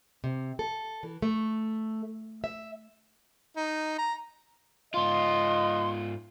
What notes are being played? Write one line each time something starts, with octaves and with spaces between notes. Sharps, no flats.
C3
A4
E3
A3
E5
D#4
A#5
G#2 F4 D#5 C6